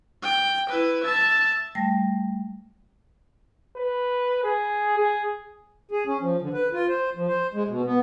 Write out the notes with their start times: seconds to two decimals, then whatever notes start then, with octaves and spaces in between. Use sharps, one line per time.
0.23 G5
0.69 E4 B4
1.03 E5 A5
1.75 G3 A3 G5 A5 A#6
3.77 B4
4.44 G#4
4.98 G#4
5.91 G#4
6.06 C#4
6.21 F3
6.42 D3
6.54 B4
6.73 F4
6.88 C5
7.16 F3
7.27 C5
7.54 G#3
7.68 B2
7.85 B3